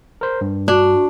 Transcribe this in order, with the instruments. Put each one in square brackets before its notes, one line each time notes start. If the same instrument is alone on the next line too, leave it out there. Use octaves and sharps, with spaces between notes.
[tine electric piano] A#4 C5
G2
[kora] D4 [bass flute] F#4